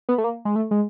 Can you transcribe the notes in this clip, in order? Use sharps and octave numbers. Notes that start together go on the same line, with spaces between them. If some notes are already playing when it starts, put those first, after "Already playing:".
B3
A3
A#3
G#3
A3
G#3